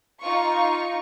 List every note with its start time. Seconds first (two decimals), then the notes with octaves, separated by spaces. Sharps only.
0.22 D#4 F4 C#6